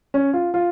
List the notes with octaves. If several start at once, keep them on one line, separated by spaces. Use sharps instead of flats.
C#4
F4
F4